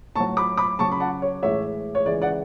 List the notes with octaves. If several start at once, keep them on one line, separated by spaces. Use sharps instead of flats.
A2 F#3 A5 C#6
B5 D6
B5 D6
C#3 F#3 A5 C#6
B5
F#5 A5
C#5
A2 E3 G#3 C#5 E5
C#5
C#3 E3 G#3 D5
D5 F#5